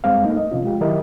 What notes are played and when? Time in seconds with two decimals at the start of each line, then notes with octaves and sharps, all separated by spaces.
0.04 F#2 G3 G#3 C4 G#4 F5
0.24 A3 A#3 D#4
0.37 D#5
0.51 C3 F3 C#4 F4
0.63 G#3 F4 G4
0.81 D#3 F#3 E4 G4 A#4 D#5